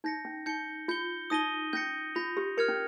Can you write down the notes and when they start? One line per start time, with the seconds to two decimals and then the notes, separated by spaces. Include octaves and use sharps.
0.04 D#4 G6 A#6 C#7
0.25 C#4
0.46 D#4 G6 C#7 G7
0.88 F4 G6 C#7 G7
1.30 D#4 D#6 A#6 D#7 G7
1.73 C#4 G6 A#6 C#7
2.15 F4 G6 A#6 F7
2.37 G4
2.57 A#4 F6 G#6 C#7 F7
2.69 C#4